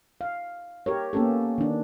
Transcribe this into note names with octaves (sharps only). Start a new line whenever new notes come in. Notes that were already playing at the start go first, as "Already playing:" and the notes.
F5
G4 A#4 C#5
A#3 B3 C#4 G4 A4
D#3 D4